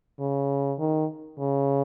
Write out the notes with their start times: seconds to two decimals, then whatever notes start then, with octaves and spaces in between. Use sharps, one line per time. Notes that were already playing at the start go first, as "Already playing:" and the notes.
0.20 C#3
0.79 D#3
1.39 C#3